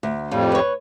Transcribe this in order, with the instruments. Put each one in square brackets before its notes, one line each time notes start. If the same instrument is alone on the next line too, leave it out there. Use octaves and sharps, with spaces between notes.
[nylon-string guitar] D2
[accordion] F2 G3 [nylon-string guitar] A2 F4
[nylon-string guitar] B4 C#5